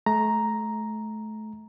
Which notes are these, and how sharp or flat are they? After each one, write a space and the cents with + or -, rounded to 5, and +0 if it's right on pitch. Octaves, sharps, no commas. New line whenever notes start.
A3 -30 A#5 +0